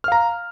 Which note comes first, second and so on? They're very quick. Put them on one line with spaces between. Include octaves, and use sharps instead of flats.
F6 F5 A#5